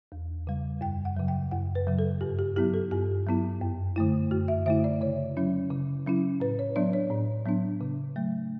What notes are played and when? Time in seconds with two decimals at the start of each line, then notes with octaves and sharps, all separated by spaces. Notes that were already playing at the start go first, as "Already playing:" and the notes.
0.12 E2
0.47 C#3 G3
0.81 F#2 G5
1.05 F#5
1.17 C#3 F#3
1.28 G5
1.51 F#2 F#5
1.75 B4
1.87 C#3 F#3
1.99 A4
2.21 G2 G4
2.39 G4
2.56 F#3 B3 E4 G4
2.74 A4
2.91 G2 G4
3.27 F#3 B3 E4
3.61 F#2
3.96 D3 A3 E4
4.31 F#2 F#4
4.48 E5
4.66 D3 A3 E4 E5
4.84 D5
5.01 C#3 C#5
5.37 F#3 C#4 E4
5.71 C#3
6.06 F#3 C#4 E4
6.40 A2 B4
6.59 C#5
6.76 F#3 B3 D4 D5
6.93 C#5
7.10 A2
7.45 F#3 B3 D4
7.81 C#3
8.16 F#3 A3